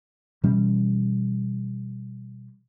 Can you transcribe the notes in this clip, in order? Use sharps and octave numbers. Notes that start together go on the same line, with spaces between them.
B2 E3 G3 C#4